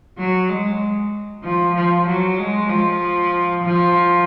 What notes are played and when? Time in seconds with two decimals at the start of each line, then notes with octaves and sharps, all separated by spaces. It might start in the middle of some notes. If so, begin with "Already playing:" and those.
0.18 F#3
0.49 G#3
1.44 F3
1.75 F3
2.07 F#3
2.38 G#3
2.69 F3
3.64 F3